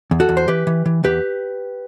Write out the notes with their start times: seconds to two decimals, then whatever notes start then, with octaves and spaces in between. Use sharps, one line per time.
0.11 E2
0.20 F#4 A4
0.29 E2
0.37 C5
0.48 E3 G4 B4
0.67 E3
0.86 E3
1.04 E2 G4 B4